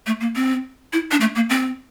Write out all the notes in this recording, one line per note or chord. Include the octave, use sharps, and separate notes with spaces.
A3
A#3
C4
E4
D4
A3
A#3
C4